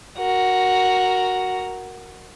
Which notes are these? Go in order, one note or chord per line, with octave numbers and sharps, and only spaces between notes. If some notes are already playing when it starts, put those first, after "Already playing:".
F#4 A#4